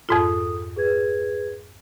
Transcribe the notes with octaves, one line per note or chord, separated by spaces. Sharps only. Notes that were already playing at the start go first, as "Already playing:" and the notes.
F2 G#2 F4 A4 D#6
G#4 B4 G#6